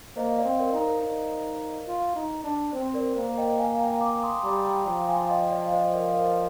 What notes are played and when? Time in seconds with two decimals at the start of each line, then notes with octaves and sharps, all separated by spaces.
0.16 A#3 C5 D#5
0.38 D5 F5
0.45 C4
0.59 A#4 D5
0.73 D#4
0.81 A#4
1.02 D#4
1.88 F4
2.16 D#4
2.44 D4
2.73 C4 C5
2.94 A#4 D5
3.16 A#3 C5
3.37 D#5 G5
3.59 F5 G#5
3.80 G5 A#5
4.01 A#5 D6
4.23 C6 D#6
4.44 G3 A#5 D6
4.65 G5 A#5
4.86 F3 G5 A#5
5.08 F5 G#5
5.30 D#5 G5
5.51 D5 F5
5.72 C5 D#5
5.93 A#4 D5
6.15 A#4